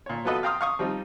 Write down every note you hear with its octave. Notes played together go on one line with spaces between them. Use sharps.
A#2 C#5
F#3 B3 F4 A4 B4 D#5
F5 G5 A#5 C6 D#6 F6
F5 C#6 D#6
F3 G3 C4 D#4 F4